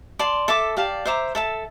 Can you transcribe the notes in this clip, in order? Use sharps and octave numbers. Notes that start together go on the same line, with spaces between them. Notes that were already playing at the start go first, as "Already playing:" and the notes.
D5 A5 C6
A4 E5 A5 D6
G4 D5 F5 A5
C5 E5 A#5 D6
A4 E5 A5